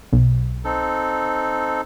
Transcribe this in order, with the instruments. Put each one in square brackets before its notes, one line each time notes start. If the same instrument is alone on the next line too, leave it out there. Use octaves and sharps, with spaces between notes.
[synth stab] B1
[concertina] C4 D#4 A4